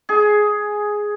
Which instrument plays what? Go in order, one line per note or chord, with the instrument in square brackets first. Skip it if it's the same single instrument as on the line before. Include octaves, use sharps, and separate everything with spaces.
[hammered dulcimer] G#4